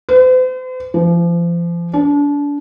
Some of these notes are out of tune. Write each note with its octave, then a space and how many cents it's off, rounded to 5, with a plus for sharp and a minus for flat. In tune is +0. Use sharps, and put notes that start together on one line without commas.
C5 -45
F3 -35
D4 -30